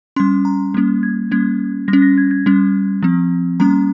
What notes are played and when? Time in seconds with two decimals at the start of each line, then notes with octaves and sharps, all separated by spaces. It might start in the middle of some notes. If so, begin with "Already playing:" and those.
0.16 G3 C#4 C6
0.45 A#5
0.74 G3 A#3 C#4
1.03 G#6
1.31 G3 A#3 C#4 G#6
1.88 G3 A#6
1.93 C#4
2.02 A#6
2.18 G#6
2.31 G#6
2.46 G3 C#4
3.03 F3 C4
3.60 G3 A#3 C#4 A#5